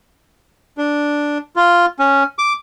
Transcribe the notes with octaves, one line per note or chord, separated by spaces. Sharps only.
D4
F4
C#4
D6